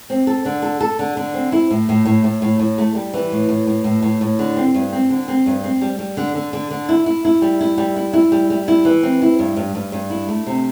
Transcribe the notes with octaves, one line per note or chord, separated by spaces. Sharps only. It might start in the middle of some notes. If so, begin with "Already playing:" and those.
C4
A4
D3
A4
A4
D3
D3
C4
E4
A2
A2
A2
A2
A2
A2
A3
G3
E3
A2
A2
A2
A2
A2
A2
D3
C4
G2
C4
D3
C4
G2
C4
G3
G3
D3
D3
D3
D3
E4
E4
E4
G3
E4
G3
E4
E4
G3
G3
E4
E3
C4
E4
G2
G2
G2
G2
E4
A3
C3